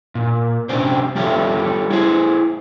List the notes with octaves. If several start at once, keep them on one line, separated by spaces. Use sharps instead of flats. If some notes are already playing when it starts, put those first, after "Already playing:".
A#2
C3 C#4 D4 C5
G3 F4 G4 A4 C#5 E5
E4 G#4 C5